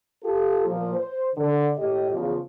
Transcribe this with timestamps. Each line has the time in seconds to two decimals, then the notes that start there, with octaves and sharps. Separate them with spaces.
0.23 F4 G4 A4
0.65 A#2 F3
0.95 C5
1.36 D3
1.77 A2 G4 D#5
2.10 E2 C#3 F3